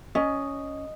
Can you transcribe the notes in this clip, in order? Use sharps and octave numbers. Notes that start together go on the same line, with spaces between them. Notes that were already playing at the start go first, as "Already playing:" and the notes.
C#4 D#5